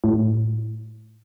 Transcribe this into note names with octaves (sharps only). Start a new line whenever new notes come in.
A2